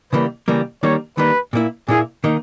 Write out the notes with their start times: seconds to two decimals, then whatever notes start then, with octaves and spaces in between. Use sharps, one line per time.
0.13 C#3 E3 G3 A#3 B4
0.48 C#3 E3 G3 A#3
0.83 D#3 G3 A#3 C#5
1.18 D#3 G3 A#3 B4
1.53 A#2 A#3 E4
1.88 A#2 A#3 E4 G#4
2.24 D#3 A#3 D#4